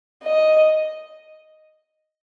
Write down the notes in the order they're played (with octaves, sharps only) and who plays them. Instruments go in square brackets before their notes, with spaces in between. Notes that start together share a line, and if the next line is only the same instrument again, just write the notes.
[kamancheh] D#5